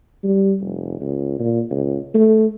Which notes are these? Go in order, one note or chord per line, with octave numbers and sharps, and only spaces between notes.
G3
F1
C#2
A#2
C#2
A3